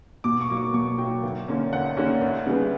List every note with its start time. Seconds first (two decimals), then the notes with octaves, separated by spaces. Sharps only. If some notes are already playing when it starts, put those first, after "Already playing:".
0.24 B2 D6
0.41 C#6
0.49 F#3 A#3
0.57 D6
0.73 B2 C#6
0.98 F#3 A#3 G5
1.23 D2
1.48 D3 A#3 C#4
1.73 D2 F#5
1.97 D3 A#3 C#4
2.22 D2
2.47 C#3 G3 B3